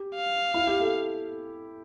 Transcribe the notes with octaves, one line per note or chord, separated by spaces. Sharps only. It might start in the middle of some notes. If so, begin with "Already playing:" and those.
Already playing: G4
F5
E4
G4
A4